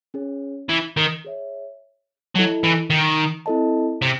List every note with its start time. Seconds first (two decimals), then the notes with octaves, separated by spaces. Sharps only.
0.14 C#4 G#4 C#5
0.69 E3
0.97 D#3
1.25 G#4 C#5 E5
2.35 F#3 E4 A4 D#5 A5
2.63 E3
2.90 D#3
3.46 C4 E4 A4 D#5 A5
4.02 C3